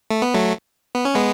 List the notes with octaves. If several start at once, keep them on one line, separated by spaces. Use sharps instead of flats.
A3
B3
F#3 A3
B3
C#4
G#3 B3